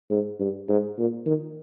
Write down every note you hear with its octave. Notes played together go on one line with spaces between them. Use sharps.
G#2
G2
G#2
A#2
D#3